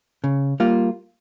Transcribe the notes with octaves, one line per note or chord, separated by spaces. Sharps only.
C#3
G3 A#3 F4